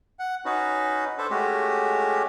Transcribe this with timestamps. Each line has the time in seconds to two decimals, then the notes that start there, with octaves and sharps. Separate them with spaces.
0.19 F#5
0.45 C#4 D#4 F#4 B4
1.18 D4 A4 B4 C5
1.30 G#3 A3 C#4 F#4 G4